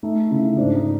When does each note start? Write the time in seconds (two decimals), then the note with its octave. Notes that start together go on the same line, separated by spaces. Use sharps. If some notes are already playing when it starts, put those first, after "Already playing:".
0.03 A3 D#4
0.30 C#3 E4
0.57 G#2 D4
0.75 D#4